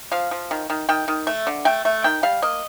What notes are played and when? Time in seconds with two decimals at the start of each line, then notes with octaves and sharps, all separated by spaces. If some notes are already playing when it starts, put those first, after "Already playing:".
0.12 F3 F5
0.31 F3
0.51 D#3
0.70 D#3
0.89 D#3 G5
1.08 D#3
1.27 A3
1.47 D3
1.65 A3 G5
1.85 A3
2.04 D#3 G5
2.23 G3 F5
2.42 A#3 D#5